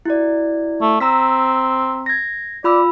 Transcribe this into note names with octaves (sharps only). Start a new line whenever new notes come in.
E4 F#4 D5
A3
C4 A#5 E6 B6
G#6 A#6
F4 D5 B5 E6